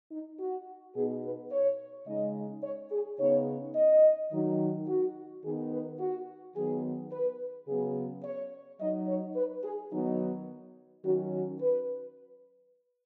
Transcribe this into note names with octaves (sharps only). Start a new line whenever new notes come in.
D#4
F#4
B2 B3 D#4 G#4
B4
C#5
C#3 G#3 D#4 D#5
C#5
G#4
C#3 B3 D#4 C#5
D#5
D#3 F#3 D#4
F#4
D#3 B3 D#4 G#4
B4
F#4
D#3 F#3 B3 G#4
B4
C#3 F#3 B3 G#4
C#5
F#3 D#4 D#5
C#5
B4
G#4
D#3 F#3 B3 D#4
D#3 F#3 C#4 F#4
F#4
B4